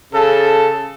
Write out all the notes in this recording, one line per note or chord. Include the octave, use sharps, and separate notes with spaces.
C#3 A4